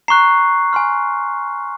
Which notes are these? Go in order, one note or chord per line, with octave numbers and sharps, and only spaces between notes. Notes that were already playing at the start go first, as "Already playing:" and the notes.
A#5 C#6 F#6 C7
G#5 C6 F6